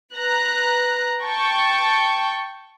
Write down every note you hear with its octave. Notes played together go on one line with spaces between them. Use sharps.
B4 A#5 F#6
G5 A5 C#6